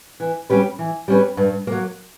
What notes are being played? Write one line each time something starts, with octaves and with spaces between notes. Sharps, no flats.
E3
G3 C#4 G4 B4
E3
G3 C#4 G4 B4
G2
F#3 A#3